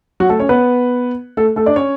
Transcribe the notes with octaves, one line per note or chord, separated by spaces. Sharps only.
F#3 F#4
A3 A4
C#4 C#5
B3 B4
A3 A4
A3 A4
D4 D5
C#4 C#5